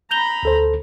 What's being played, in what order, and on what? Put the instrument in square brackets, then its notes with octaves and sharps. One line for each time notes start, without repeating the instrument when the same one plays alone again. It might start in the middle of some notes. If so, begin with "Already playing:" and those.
[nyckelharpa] A#5 B5 [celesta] G6 F7 G7
[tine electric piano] D2 A4 C5